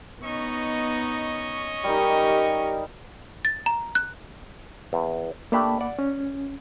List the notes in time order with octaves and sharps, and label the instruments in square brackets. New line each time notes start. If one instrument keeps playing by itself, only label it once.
[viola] B3 D#4 [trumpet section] C#4 D#5 C#6
[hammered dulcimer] G3 D#4 [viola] G4 A#4
[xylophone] A6
A#5
F#6
[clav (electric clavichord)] E2
[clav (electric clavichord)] A3 D4 G4 [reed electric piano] A#3 B5
[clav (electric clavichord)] D5 F#5
[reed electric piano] C#4